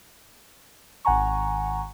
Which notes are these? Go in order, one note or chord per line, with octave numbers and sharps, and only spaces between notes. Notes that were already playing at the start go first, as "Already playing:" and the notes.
G#1 F#5 G#5 A#5 C#6